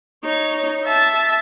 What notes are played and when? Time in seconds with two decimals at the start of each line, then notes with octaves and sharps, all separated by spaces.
0.24 D#4 C#5
0.85 E5 A5